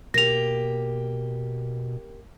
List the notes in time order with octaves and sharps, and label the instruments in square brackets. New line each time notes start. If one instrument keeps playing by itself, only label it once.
[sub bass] B2 [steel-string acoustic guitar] A#3 G4 [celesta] A#6 F7